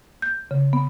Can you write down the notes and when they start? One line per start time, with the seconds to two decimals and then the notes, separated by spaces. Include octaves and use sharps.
0.22 G6
0.51 C#3
0.73 B3